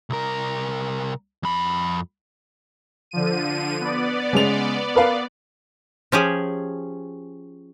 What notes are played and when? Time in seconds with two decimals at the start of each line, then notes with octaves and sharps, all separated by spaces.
0.10 C2 A#4
1.43 F2 B5
3.11 D3 F3 D#7
3.80 B3 D5
4.33 C#3 G#3 F7
4.95 A#4 B4 F5
6.12 F3 C#4 G4 G#4